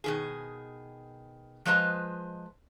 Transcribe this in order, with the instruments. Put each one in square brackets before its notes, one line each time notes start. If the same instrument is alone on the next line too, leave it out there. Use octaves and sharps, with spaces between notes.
[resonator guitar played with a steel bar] B2 D#3 G#4
F3 G#3 B4 C5 D#5 A#5